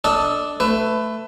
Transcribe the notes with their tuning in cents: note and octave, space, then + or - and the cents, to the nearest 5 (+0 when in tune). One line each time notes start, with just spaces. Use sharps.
D4 +0 A4 +0 D#5 +25
A3 +10 B4 +20